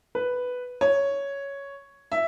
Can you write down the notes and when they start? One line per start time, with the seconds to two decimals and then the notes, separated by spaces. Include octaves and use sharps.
0.15 B4
0.81 C#5
2.12 E5